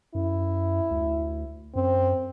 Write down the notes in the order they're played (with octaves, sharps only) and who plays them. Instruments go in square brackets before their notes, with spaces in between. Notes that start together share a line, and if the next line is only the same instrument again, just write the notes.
[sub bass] F#2 [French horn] E4
[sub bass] D2
[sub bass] F#2 [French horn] C4